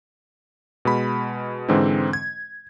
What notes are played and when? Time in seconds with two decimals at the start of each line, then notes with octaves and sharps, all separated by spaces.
0.85 B2 G#3 B5
1.69 G#2 D3 E3 G#3 C4
2.13 G#6